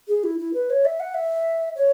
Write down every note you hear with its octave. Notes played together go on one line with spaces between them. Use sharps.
G#4
E4
E4
B4
C#5
E5
F#5
E5
C#5